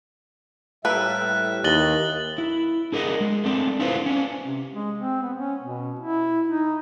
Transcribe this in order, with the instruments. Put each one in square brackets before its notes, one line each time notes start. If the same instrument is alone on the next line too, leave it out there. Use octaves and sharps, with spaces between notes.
[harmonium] A2 G3 E5 [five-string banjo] A#3 A4 B4 [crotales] F#6
[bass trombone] D#2 [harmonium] E3 [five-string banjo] D#5 [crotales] A6 F#7 G7
[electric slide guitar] E4
D4 G#4 A#4 D5 D#5
G#3
A3 C4 D4
D4 E4 F4 B4 C5
C#4 D4
[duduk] C3
G#3
C4
B3
C#4
B2
E4
D#4